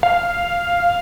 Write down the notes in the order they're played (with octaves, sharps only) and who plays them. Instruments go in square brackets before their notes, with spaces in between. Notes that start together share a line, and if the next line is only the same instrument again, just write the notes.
[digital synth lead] F5